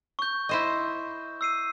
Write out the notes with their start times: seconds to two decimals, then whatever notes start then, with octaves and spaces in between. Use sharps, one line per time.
0.19 C#6 G6
0.49 E4 C5 D#5
1.41 E6 C7 D#7